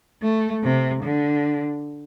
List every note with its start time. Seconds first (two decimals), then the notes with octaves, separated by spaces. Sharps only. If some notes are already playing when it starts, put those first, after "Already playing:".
0.22 A3
0.63 C3
1.03 D3